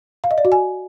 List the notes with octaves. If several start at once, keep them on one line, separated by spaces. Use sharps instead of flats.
F5
D#5
D5
F#4
G#5